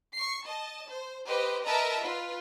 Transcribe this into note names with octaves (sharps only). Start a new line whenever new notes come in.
C#6 C7
D#5 A5
C5
G4 B4 C5 D#5
A#4 B4 D#5 E5 A5 A#5
F4 B4